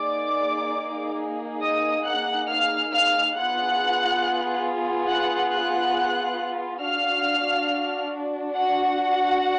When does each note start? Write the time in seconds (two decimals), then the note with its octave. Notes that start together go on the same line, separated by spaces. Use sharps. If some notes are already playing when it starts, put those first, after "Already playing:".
Already playing: A#3 D#4 G#4 D5 D6
1.62 D#5 D#6
2.05 F#5 F#6
2.48 F5 F6
2.92 F5 F6
3.35 B3 F4 G#4 F#5 F#6
5.08 F#5 F#6
5.51 F#5 F#6
6.82 D4 F#4 F5 F6
8.54 F#4 F#5